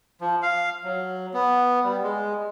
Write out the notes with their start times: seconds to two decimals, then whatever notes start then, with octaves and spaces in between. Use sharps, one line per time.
0.21 F3
0.42 F5
0.84 F#3
1.34 B3
1.84 G3
2.03 G#3